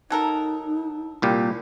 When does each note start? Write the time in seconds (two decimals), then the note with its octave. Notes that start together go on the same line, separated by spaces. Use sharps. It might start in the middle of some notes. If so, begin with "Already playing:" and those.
0.10 F#3 D#4 A4 A#4
1.22 C2 A#2 G4